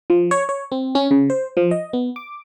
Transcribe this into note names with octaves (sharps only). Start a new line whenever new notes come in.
F3
C#5
C#5
C4
C#4
C#3
C5
F3
D#5
B3
D6